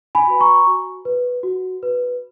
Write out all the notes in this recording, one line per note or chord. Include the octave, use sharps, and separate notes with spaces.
G#5 B5
F#4 B4
A#5 C#6
F#4
B4
F#4
B4